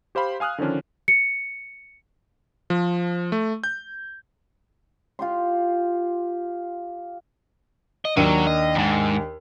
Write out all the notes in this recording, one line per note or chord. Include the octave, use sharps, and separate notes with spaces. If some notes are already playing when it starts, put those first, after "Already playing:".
G4 C5 F5 B5 C6
F5 G#5 D#6 F6 F#6
D3 D#3 F3 C#4 D4
C#7
F3
A3
G6
F4 G4 C6
D#5
D#2 F#3 D4 D#7
D#5
F2 G#2